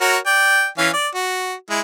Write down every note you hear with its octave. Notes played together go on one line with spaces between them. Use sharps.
F#4 A#4 C#5
D5 G5
E3 C#4 F5
D5
F#4
G#3 E4